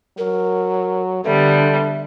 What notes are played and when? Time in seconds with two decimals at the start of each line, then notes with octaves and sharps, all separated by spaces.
0.18 F#3 A#4
1.25 D3 G3 B3 A4 E5